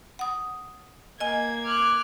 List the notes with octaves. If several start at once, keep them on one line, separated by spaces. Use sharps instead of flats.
F#5 D#6
A#3 D#5 G#5 G#6
D6 F6 F#6